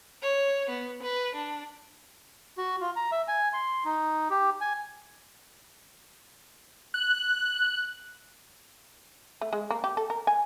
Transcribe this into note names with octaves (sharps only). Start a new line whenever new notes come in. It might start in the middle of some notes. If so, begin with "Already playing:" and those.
C#5
B3
B4
D4
F#4
F4
A#5
E5
G#5
C6
D#4
G4
G#5
F#6
A3
G#3
A#3
G4
A4
A#4
G#5